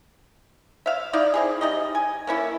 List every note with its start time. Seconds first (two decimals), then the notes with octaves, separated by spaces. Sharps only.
0.86 E5 F5
1.13 D#4 E4 D5 F5
1.34 C4 E4 G#4
1.61 G3 D#4 D#5
1.95 G#5
2.27 A#3 C#4 E4 A4